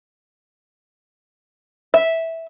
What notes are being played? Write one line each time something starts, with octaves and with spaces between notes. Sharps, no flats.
E5